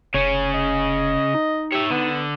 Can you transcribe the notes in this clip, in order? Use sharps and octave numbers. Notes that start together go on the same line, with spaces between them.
F1 C#3 C#4 C#5
D#5
D#4
G4 C#5 E5
D3 B3